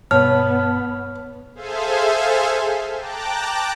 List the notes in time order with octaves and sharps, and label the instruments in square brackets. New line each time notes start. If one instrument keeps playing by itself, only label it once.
[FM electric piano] G2 B2 A5 [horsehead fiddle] B3 [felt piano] C#5 [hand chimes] F6
[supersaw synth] G#4 A4 C5 E5 F5 G#5
G5 A5 A#5 D6 F#6